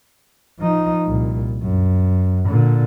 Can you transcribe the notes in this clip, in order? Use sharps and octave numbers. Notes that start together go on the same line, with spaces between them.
F3 D#4
C2 A#2
F#2
A#2 D3